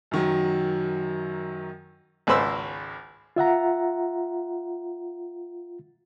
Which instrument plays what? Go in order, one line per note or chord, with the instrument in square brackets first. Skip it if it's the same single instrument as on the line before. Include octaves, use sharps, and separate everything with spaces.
[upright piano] F#2 D#3 F#3
[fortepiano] G#1 C#2 B4 C5 B5 E6
[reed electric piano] F4 E5 F#5 A#5